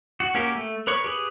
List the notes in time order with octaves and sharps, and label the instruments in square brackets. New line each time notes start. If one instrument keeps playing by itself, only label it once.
[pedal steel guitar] F#4
A#3 C#4 F#4 G4 A#4
A3
A#4 B4 C#5 C#6
G4 G#4 B4